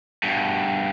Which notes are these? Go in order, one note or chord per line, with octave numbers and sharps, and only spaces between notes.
G2 B2